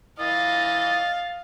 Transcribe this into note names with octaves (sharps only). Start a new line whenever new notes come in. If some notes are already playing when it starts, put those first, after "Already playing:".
E3 D#5 F5 A6